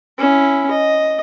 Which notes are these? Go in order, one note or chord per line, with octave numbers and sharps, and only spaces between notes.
C#4 E4
D#5